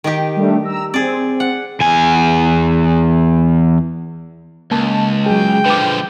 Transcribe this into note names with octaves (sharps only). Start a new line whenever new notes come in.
D#3 D#4 G4
G3 A3 D4
A#5 E6
C4 G#4 D5
F#5
E2 G#5
C#2 A#3 A5
F#3 G#4 G5
D3 F3 B4 D6